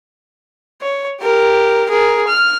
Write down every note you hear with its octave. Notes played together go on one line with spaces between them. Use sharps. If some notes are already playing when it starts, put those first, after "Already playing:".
C#5
G4 A#4
G#4 A#4
F6